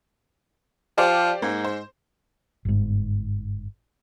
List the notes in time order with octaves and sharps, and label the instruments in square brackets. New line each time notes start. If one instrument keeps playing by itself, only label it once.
[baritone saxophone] F3 [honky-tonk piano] G4 C5 D5
[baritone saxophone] G#2 [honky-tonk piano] A#3
[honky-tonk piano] C5
[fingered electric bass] G1 G#2